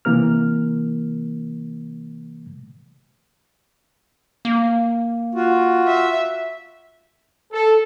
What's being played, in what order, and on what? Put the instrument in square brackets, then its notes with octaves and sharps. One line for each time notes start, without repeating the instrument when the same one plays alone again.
[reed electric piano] C3 E3 A#3 A#4 F6
[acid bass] A#3
[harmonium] F4 F#4
[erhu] E5
[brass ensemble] A4